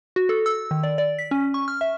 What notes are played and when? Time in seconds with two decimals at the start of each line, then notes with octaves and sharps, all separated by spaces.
0.16 F#4
0.29 A4
0.46 E6
0.71 D#3
0.83 D5
0.98 D5
1.19 B6
1.31 C#4
1.54 C#6
1.68 F6
1.81 E5